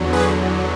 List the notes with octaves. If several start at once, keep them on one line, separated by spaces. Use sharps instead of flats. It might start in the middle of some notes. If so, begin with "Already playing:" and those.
Already playing: E2 D3 F#3
G#4 B4